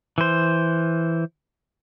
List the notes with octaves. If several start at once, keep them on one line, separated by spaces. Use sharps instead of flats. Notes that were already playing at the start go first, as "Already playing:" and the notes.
E3 C5